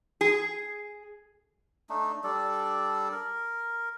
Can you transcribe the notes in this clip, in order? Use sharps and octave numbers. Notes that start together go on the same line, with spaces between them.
G#4
A3 D4 D#4
G3 D4 A4 D5
A#4